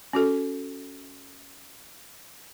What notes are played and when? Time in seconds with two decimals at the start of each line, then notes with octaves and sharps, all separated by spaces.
0.13 C#4 F#4 A4